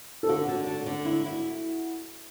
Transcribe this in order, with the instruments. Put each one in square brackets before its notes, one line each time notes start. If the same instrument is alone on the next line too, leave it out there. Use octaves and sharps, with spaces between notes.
[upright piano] A4
[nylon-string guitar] D3 [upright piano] F#4
[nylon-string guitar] D3
D3
D3
E4
E4